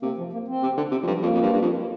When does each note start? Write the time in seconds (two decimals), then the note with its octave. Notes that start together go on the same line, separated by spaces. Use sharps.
0.02 C3 A#3
0.18 F3
0.33 A#3
0.48 C4
0.63 C3
0.77 D3
0.92 C3
1.03 F2
1.06 G2 F3
1.15 G3
1.22 F2 A#3
1.34 F2
1.42 G2
1.53 G2
1.62 F2